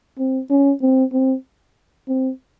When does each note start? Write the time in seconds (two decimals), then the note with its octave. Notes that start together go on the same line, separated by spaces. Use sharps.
0.19 C4
0.50 C#4
0.82 C4
1.13 C4
2.08 C4